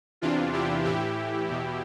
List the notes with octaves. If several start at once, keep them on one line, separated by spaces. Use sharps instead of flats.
E2 C3 E3 D4 F4
E4 G4
A2 E3 E4 G4
E2 B2